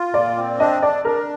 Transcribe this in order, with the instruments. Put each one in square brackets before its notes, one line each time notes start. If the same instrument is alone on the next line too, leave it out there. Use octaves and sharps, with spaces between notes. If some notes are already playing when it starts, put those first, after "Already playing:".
Already playing: [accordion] F4
[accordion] A#2 [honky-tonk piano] D5
[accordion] C4
[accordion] D4 [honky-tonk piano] D#5
[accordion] D4 [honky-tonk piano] D5
[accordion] D4 [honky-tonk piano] A#4